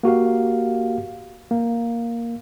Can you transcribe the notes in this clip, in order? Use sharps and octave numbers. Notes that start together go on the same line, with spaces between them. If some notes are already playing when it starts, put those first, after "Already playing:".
A#3 F#4 G4 F5
A#3